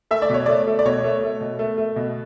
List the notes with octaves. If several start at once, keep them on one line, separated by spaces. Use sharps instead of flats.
A3 E5
D5
B2 C#5
A3 D5
A3
D5
B2 C#5
A3
A3
B2
A3
A3
B2